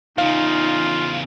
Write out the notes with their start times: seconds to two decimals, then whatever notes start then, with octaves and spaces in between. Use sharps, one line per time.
0.18 E2 C#3 D#4 F4 F5